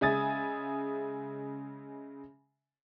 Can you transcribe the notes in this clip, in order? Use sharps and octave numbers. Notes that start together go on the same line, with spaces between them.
C#3 G#3 E5 G#5 D#6 A6